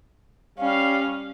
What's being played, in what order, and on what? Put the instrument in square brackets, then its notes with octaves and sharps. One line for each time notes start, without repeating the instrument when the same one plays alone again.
[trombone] G3 [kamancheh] C#4 [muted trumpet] F5